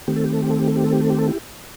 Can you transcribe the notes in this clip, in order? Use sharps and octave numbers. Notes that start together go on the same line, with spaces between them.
D#3 A3 C4 G4
A4
G4
A4
G4
A4
G4
A4
G4
A4
G4
A4
G4
A4
E4 G4